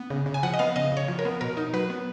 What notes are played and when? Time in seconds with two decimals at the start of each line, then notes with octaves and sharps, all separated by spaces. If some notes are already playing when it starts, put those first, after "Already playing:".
Already playing: B3
0.10 C#3
0.26 C#3
0.34 G#5
0.43 F3 F#5
0.54 D#5
0.59 B3 F5
0.76 C#3 D#5
0.92 C#3 C#5
1.08 F3
1.19 A#4
1.25 B3
1.41 B2 A#4
1.57 D#4
1.73 F#3 B4
1.90 B3